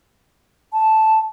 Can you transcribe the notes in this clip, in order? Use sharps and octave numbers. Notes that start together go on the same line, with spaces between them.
A5